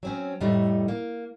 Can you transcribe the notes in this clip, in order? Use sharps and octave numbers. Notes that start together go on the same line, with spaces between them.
F#3 C4 C#4
F2 A2 G3 A3 D#4
A#3